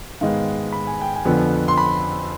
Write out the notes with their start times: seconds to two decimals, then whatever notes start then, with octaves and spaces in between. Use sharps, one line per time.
0.21 G#2 D#3 G#3 B3 F5
0.73 B5
0.87 G#5
1.01 G5
1.15 G#5
1.25 F2 D3 F3 B3
1.68 C6
1.78 B5